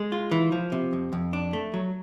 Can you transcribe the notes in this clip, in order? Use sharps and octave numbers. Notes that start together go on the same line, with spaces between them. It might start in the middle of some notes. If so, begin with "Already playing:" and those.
Already playing: G#3
F4
E3
F3
C3
F2
F2
D4
A3
F#3